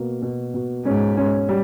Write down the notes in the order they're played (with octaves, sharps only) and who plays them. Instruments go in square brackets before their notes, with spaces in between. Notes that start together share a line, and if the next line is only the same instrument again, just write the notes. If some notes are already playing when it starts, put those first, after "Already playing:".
Already playing: [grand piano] B2 A#3
B2
B2
[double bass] G#2 [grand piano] C#4
[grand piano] C#4
G3